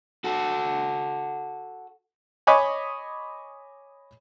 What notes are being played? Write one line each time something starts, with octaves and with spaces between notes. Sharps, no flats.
F#4 A4
C#5 D#5 G#5 B5 C#6 D6